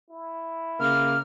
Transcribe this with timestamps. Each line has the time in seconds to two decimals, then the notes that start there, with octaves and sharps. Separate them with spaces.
0.11 E4
0.80 C#3 A#3 F6